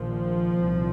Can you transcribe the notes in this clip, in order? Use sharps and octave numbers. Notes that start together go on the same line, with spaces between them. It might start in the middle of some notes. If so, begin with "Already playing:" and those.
Already playing: A#1 A#2 D#3 F3
C2 A#2